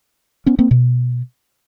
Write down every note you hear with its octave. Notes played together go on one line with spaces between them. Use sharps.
B3 C#4
A#3 C4
B2